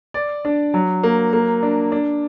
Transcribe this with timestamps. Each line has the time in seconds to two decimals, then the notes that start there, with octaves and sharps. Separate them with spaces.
0.14 D5
0.45 D4
0.74 F#3
1.03 A#3
1.33 A#3
1.63 D4
1.92 D4